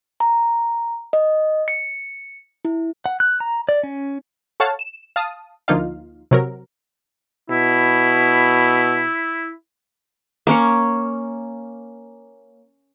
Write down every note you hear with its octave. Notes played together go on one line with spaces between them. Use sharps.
A#5
D#5
C#7
E4
F#5
F#6
A#5
D5
C#4
A4 C#5 F5 F#5 A5
E7
F5 A5 D#6
D2 F3 A#3 D#4 F4 F5
C3 F#3 A#4
B2 E4
A#3 C#4 C#5